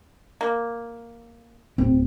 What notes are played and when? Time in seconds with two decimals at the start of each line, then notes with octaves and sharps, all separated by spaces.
0.41 A#3
1.78 D1 C4